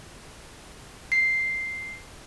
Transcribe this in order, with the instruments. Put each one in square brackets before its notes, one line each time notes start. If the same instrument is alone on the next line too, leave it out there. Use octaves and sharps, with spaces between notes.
[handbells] C7